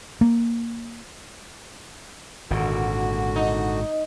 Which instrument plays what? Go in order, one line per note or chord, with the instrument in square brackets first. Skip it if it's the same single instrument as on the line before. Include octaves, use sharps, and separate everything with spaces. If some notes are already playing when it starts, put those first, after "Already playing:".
[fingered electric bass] A#3
[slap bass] G#1 A#2 [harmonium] D3 F#4
[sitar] D#4